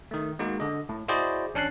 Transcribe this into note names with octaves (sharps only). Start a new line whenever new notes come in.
D#3 A3
G#3 A#3 D#4 F#4
D3 D#5
A2
E4 F#4 G#4 C5 D5 D#5
A1 C#4 D4 A5 F#6 C7